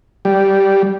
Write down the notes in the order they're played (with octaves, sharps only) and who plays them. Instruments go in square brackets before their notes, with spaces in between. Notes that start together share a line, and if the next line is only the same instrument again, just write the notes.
[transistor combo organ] G3